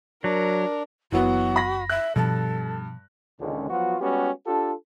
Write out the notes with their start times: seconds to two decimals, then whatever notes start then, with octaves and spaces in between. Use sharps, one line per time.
0.24 F#3 D4 A#4
1.12 F#1 E3 F#3 B3 F#4
1.56 B5 A#6
1.89 E5 F#6
2.16 G2 B2 F3 A4
3.40 C#2 A#2 D3 D#3 G#3 C#4
3.70 F3 F#3 B3 F4 F#4
4.01 G3 G#3 B3 C#4 F#4 G4
4.46 D4 F4 G4 A4